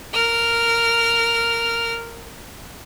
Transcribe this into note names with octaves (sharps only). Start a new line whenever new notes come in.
A#4 F6